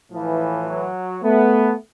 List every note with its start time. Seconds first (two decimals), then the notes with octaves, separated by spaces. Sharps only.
0.12 A2 E3 F3
0.68 F#3
1.23 A3 B3